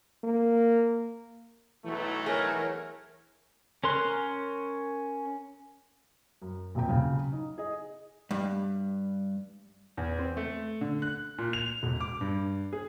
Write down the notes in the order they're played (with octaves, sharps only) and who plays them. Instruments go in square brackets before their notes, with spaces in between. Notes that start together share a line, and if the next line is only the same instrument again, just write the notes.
[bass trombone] A#3
[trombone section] B1 F#3 A3 [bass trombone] E3
[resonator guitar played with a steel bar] G#4 [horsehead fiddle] A#4 C#5
[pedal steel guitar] C#4 A#4 C6 F#6
[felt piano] F#2
D#1 A#1 C3 G5
C#3 F#3
D#4
G#4 D#5
[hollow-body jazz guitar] G2
[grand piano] E2
C4
A3
D3
F#6
A#2
F7
E1
D6
G2
G#4